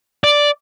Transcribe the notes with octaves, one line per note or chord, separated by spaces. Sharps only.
D5